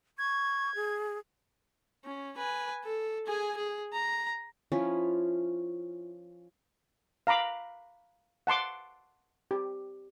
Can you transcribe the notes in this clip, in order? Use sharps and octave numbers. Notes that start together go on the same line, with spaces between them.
C#6 G#6
G#4
C#4
B4 G#5
A4
G#4 G#5
G#4
A#5
F3 C#4 E4 F4
F5 A#5 B5 D6
F#5 A5 C6 D6
G4